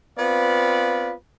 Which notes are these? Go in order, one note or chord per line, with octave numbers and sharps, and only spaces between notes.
B3 C4 F4 B4 D5 F5